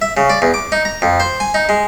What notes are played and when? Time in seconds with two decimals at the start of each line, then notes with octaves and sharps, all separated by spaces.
0.02 E5
0.17 C#3
0.30 D5
0.42 E2
0.54 D6
0.72 D#4
0.85 A#5
1.02 F2
1.20 C5
1.40 G#5
1.54 D#4
1.69 G#3